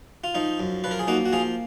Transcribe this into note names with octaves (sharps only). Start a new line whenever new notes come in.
F4
F3 D#4
F#2
F3 B4
A#4
G#4
A#3 D#4 F#4
F#4
F3 F4 G#4